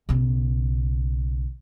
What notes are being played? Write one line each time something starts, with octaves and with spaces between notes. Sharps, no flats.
B1 C#3